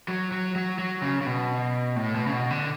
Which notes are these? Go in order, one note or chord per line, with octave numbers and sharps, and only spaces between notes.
F#3
F#3
F#3
F#3
C#3
C#3
B2
A2
B2
C#3
B2
D3